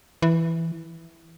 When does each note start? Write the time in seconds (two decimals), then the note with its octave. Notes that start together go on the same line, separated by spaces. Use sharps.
0.22 E3